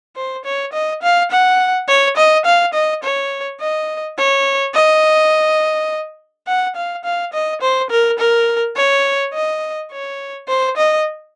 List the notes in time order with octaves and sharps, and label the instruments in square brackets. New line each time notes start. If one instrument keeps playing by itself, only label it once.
[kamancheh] C5
C#5
D#5
F5
F#5
C#5
D#5
F5
D#5
C#5
D#5
C#5
D#5
F#5
F5
F5
D#5
C5
A#4
A#4
C#5
D#5
C#5
C5
D#5